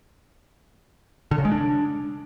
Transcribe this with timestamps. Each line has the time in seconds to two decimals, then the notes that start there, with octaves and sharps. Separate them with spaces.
1.31 D3
1.38 C#3
1.45 G#3
1.52 D4